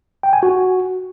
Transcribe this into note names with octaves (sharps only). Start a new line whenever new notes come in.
G5
G#5
F#4